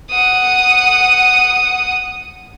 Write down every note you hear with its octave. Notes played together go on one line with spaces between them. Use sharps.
F#5 D#6